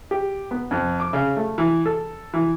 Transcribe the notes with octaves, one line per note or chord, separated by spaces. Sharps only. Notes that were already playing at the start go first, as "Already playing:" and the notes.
G4
B3
F2
D6
C#3
A3
E3
A4
E3